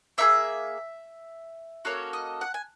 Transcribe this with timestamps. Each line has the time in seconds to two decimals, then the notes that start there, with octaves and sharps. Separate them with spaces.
0.18 A#3 D#4 G#4 E5
1.85 A#3 C#4 F#4 A4 C#5
2.13 D#5
2.41 F#5
2.54 G#5